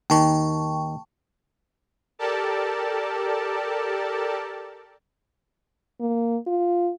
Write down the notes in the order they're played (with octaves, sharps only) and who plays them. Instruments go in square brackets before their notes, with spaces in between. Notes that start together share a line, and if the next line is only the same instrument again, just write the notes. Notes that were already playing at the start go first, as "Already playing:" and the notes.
[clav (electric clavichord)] D#2 D#3 [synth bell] G5 A5 C#6
[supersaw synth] G4 A4 A#4 D5 A5
[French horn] A#3
F4